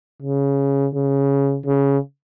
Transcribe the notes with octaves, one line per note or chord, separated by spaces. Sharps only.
C#3
C#3
C#3